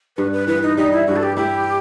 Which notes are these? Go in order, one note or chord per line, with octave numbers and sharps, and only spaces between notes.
G2 B4
B4
E3 B4
D#4
G3 D#4
E4
G2 F#4
A4
G4
E4 G4